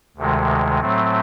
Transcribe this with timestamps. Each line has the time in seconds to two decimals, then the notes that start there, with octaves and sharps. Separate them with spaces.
0.17 D2 C3 D#3 G#3
0.79 A2 F#3 A3 C4